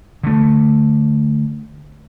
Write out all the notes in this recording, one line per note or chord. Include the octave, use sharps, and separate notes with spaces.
D3 A3